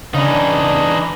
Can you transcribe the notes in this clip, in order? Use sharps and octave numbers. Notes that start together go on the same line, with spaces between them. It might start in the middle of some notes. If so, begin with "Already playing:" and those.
C#3 E3 D4 D#4